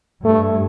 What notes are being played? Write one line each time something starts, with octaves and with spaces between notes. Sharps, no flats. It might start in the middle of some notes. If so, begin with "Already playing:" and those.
G2 A3